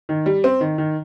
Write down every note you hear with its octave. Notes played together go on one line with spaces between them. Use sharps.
D#3
G3
C4
D#3
D#3